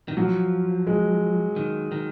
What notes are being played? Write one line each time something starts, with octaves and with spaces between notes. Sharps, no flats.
D#3
F3 F#3
G#3
D#3
D#3